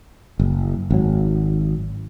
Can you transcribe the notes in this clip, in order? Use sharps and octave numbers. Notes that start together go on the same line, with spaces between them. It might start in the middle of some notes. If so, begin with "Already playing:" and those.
F#1
G#1 F#3